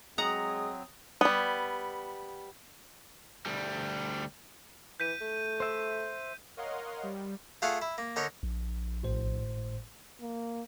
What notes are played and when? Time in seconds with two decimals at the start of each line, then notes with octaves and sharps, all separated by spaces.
0.18 F#3 G#3 C4 F#5 A#5 D#6
1.21 G3 B3
3.46 D2 G3
5.00 E3 G6 B6 D#7
5.21 A3
5.60 C5 E5
6.57 A#4 C#5 D#5 F5 F#5 C6
7.03 G3
7.62 A3 F4 G#4 F5 F#5 G#5
7.82 E4
7.98 A#3
8.16 D3 D#4 A#4 C#5
8.43 A#1
9.03 G#1 A2 C5
10.21 A#3